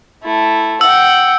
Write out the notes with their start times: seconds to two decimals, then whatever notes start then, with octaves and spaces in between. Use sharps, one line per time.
0.24 A3 E4
0.81 F#5 G5 E6